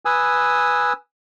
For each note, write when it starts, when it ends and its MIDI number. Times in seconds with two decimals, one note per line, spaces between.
0.05 0.93 71
0.05 0.93 80
0.05 0.93 87
0.05 0.93 88